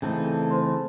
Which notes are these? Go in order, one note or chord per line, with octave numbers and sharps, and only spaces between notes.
C#3 E3 A3 C4 D#4 A4 A5
A4 A5
A5
C5 C6